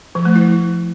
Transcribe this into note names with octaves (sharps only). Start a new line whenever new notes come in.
F3
A3
E4